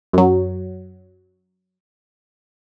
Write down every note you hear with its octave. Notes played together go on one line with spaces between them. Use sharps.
F#2 F#3